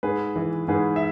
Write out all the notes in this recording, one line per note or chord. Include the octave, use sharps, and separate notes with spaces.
G#2 G#4 B4
E3
G#2 G#4 B4
E5